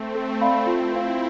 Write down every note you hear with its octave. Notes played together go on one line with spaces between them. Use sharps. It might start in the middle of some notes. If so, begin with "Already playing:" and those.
Already playing: A3 C4
A4
D5 F5 B5
C4 E4 F4
B4 F5